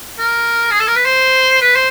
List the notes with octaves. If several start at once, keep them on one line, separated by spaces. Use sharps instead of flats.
A#4
G#4
A4
A#4
B4
C5
B4
C5